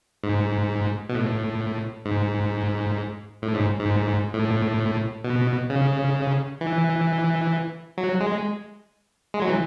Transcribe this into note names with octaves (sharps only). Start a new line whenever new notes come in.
G#2
B2
A2
G#2
A2
G#2
G#2
A2
B2
C#3
E3
F#3
G#3
G#3
F#3
E3